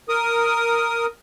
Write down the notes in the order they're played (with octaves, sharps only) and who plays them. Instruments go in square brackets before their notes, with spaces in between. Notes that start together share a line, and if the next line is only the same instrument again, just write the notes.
[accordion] A#4 D#6